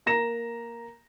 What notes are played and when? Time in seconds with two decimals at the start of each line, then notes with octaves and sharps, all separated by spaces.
0.06 A#3 A#5 A#6 E7